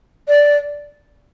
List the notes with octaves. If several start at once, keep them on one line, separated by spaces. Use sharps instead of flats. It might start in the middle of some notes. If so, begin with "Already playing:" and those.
D5